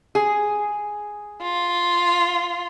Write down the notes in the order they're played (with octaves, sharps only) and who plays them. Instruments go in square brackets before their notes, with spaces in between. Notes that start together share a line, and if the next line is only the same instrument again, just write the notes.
[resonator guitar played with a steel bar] G#4
[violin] F4